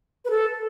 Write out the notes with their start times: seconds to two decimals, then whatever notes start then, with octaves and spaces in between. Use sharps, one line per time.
0.25 B4
0.30 A4